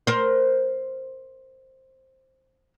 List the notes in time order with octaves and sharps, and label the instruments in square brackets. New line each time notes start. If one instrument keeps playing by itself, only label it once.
[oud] A#4 C5